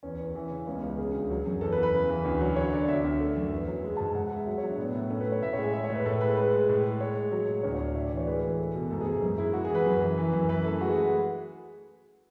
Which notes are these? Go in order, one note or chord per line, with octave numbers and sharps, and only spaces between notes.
E2 C#4
E2
E3
C#3
C#2 C#4
B3
C#2
C#4
C#3 G#4
D2
F#3
F#2
E2 A4
B4
E2
B4
C#3
E3
D2
F#3
D3 C#5
D3 D5
D2 E5
D2
A3
F#2
E2
F#3
G#3
G#2 A5
G#5
G#2 F#5
G#3 F#5
E5
F#3 E5
C#5
F#3
D4
A2 B3
A2 B3
A3 C#4
B4
A3
C#5
A2 E5
C#5
G#3 G#5
G#3 E5
C#5
A2
B4
A2 A4
G#3 B4
G#3 B4
G#3
A2
G#3
G#3 C#5
G#3
F#3
A2
D2 C#5
C#5
D2
D5
A2 E5
E3 D5
C#5
G#3 B4
E3
A3
B2
G#2 A4
G#4
G#2
G#4
F#2
G#3 E4
G#3 F#4
G#4
E3
B4
F#2
E3
E3
F#2
E3 B4
A3 A4
G#3 F#4
G#4
G#3
B4